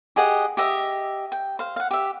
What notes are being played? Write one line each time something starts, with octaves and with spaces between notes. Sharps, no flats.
G4 G#4 D#5 F#5
G4 D#5 E5 D#6
G5
C5 F5
F5 F#5
G4 E5